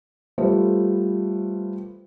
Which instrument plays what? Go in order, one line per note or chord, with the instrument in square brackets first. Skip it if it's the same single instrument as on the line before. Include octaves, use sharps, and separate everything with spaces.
[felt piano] G3 A3 F4 B4 C5